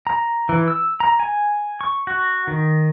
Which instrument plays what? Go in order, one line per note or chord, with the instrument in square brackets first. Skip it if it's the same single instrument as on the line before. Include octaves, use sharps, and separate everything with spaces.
[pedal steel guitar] A#5
E3
E6
A#5
G#5
C#6
F#4
D#3